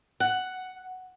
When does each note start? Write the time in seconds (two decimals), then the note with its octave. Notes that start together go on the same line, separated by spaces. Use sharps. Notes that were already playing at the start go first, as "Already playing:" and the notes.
0.20 F#5